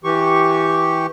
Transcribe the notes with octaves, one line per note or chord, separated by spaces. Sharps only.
E3 G4 C#6